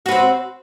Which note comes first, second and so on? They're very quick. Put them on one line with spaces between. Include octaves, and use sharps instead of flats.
F#4 B4 C4